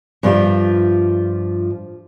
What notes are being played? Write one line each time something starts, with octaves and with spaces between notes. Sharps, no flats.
G2 F3 C#4 F4 G4 E5